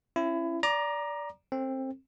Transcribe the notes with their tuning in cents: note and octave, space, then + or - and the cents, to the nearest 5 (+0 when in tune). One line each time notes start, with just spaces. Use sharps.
C#4 -25 E4 +25
D5 -15 A#5 +15 D6 +35
C4 +20 A4 +20